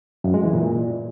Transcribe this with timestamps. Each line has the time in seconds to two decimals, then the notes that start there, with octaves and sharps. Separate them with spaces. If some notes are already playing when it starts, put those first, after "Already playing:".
0.24 F#2
0.34 G#3
0.43 E3
0.53 A#2